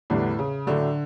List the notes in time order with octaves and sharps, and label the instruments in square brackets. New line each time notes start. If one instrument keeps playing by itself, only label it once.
[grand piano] E2 D3 G3 D4 [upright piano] A2
[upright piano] C#3
[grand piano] A2 F#3 A3 D4 [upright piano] D3